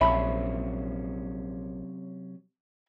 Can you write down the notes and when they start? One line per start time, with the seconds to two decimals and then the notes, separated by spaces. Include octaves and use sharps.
0.01 A#1 C3 F#3 C#4 E5 A5 B5